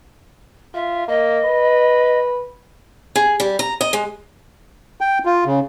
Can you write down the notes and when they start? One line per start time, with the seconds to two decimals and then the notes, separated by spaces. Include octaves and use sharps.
0.74 F4 E5
1.08 A#3 D#5
1.45 B4
3.16 G#4
3.40 G3
3.59 A#5
3.81 D#5
3.93 G#3
5.01 G5
5.25 F4
5.45 C#3